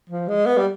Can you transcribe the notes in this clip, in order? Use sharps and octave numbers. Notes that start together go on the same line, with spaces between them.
F3
G#3
B3
G3